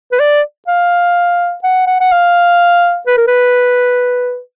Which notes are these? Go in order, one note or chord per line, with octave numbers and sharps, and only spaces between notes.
B4
D5
F5
F#5
F#5
F#5
F5
B4
A#4
B4